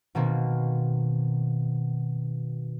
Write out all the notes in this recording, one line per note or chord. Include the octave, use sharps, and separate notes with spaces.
B2 D#3 A#3 C4